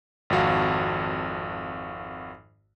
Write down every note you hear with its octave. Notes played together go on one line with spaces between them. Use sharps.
G#1 F2 F#4 F5